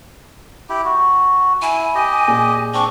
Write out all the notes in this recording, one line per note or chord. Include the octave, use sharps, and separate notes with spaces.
E4 G4
F#4
E4 G#5
G4 D#5
A#2 G#4
C4 D4 C#6